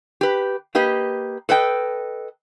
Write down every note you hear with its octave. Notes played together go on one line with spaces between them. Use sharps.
G4 B4
A#3 G4 B4 D#5
A4 B4 D#5 G5